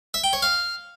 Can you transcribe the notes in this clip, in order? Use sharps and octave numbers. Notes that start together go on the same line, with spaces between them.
E5
G5
C#5
F5